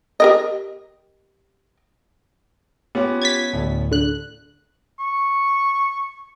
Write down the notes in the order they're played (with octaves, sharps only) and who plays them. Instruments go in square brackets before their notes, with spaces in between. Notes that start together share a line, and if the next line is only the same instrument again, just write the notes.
[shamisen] G4 A#4 D#5
[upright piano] B3 C#4 [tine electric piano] F4 G4
[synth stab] G#6 A6 B6
[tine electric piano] D2 A2
[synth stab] D3 F#6
[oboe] C#6